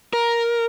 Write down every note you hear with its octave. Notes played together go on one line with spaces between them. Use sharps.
A#4